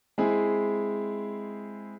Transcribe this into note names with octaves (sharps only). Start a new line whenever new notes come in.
G#3 C4 E4 G#4